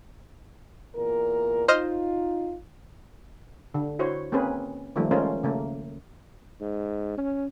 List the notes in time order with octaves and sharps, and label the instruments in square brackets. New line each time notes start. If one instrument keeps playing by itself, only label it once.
[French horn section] E2 A#2 A#4
[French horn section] D#4 F4 [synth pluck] C5 D#5 F6
[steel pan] D3
E4 F#4 C5 C#5
A#3 C4 C#4 G#4 B4
D#3 F3 G3 A3 A#3
G#3 A3 C#4 F4 A#4 C5
C#3 A3 A#3
[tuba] G#2
C#4